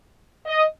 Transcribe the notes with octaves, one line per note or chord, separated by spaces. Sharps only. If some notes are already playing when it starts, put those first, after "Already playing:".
D#5